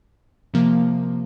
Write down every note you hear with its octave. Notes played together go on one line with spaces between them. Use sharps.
C3 F3 A#3